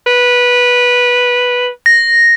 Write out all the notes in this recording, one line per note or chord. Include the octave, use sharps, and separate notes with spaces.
B4
A#6